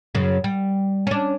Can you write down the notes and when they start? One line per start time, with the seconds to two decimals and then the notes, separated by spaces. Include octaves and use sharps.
0.15 F#2 C#3
0.44 G3
1.07 C#4 D4